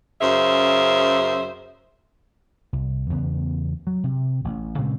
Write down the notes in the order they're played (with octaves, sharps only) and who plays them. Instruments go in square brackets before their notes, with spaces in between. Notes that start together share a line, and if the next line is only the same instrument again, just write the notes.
[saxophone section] F#2 C#3 C5 E5
[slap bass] C2
E2 C#3 B3
F#3
C3
A1
A#2 C#3 G#3 C4